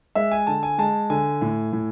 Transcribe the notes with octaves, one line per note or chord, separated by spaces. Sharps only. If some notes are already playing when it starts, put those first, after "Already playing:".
G#3 E5
G#5
D3 A5
G#5
G#3 A5
D3 G#5
A2
A2